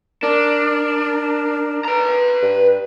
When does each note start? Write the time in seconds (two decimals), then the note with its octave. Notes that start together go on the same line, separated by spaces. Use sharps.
0.23 D4 A#4
1.85 B4 A#5
2.42 G2